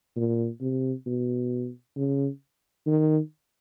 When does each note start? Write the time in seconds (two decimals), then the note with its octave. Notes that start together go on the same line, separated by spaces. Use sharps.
0.17 A#2
0.61 C3
1.06 B2
1.96 C#3
2.87 D#3